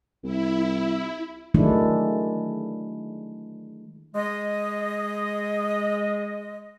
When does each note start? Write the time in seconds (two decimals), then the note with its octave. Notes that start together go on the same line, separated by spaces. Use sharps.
0.24 C2 E4
1.54 D#3 F#3 G#3 A3 D4 E4
4.15 G#3 D#5